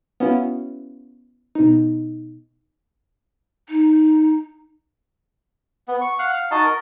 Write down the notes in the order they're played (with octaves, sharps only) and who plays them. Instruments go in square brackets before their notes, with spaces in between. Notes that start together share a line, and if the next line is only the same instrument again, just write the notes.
[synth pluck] B3 C#4 E4 F#4 F5
B2 D#4
[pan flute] D#4
[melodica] B3
C#6
F5 F#5
F5
D#4 F#4 D#5 A5
A#4